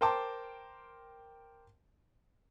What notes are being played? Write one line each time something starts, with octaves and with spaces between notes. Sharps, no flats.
A#4 C5 G5 A5 C6 D6